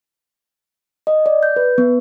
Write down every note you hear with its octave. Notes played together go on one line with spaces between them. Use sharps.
D#5
D5
G6
B4
B3